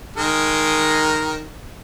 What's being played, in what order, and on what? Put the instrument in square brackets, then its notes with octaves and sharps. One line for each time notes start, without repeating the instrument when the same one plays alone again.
[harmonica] D#3 G#3 A#4